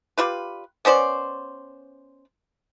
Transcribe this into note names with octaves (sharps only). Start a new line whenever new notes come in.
G3 F4 B4
B3 C#4 C5 D5